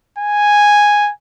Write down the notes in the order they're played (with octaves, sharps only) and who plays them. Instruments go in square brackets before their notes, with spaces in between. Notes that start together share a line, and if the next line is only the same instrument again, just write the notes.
[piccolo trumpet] G#5